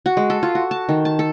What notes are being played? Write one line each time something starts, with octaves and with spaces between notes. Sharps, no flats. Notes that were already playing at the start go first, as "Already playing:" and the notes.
F#4
G#3
A4
F4
F#4
A5
D#3
A5
A4